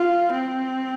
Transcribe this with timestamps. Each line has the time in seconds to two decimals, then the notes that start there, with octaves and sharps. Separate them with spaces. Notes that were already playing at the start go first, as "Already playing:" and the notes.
Already playing: F4
0.32 C4